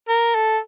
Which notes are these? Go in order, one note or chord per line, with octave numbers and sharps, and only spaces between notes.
A#4
A4